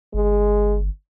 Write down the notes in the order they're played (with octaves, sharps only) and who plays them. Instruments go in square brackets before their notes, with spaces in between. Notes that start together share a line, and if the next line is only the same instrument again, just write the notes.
[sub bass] G1 [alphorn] G#3